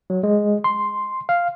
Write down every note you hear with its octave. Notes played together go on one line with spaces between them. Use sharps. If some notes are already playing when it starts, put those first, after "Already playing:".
F#3
G#3
C6
F5